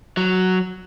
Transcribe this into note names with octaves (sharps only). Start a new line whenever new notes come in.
F#3